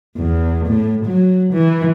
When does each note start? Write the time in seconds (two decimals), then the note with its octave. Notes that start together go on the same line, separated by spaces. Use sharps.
0.17 E2
0.67 A2
1.05 F#3
1.53 E3